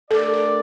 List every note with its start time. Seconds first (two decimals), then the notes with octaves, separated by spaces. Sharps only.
0.11 A3 D4 G4 A4 A#4 D5
0.33 A4